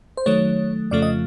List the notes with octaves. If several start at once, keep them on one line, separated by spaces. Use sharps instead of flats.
C5
D#3 F#3 A3 C#5
F2 C#3 F3 A3 D5
D#5